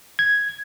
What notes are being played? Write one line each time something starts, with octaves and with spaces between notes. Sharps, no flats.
G#6